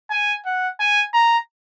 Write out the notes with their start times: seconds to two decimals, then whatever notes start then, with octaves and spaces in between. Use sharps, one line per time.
0.11 G#5
0.46 F#5
0.80 G#5
1.14 A#5